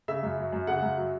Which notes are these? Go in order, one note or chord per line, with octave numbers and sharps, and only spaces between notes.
C#3 E5
F#2
F#3
F#2
C#3 F#5
F#2
F#3